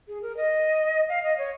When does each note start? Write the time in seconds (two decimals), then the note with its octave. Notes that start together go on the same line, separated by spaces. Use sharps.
0.08 G#4
0.22 A#4
0.37 D#5
1.09 F5
1.23 D#5
1.38 C#5